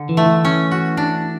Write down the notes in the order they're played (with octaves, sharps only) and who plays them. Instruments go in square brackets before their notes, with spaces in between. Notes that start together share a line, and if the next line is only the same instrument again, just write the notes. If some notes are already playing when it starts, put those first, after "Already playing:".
Already playing: [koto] D3
[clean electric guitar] E3
[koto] A3
[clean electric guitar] E3
[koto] C#4
F#4
D4